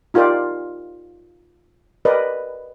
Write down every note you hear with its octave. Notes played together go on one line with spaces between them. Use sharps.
D#4 F4 G4 A#4 D5
G4 A#4 B4 D5 D#5